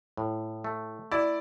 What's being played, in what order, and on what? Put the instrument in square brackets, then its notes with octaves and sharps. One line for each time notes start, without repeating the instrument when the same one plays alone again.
[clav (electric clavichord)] A2
A3
[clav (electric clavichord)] E4 [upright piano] D5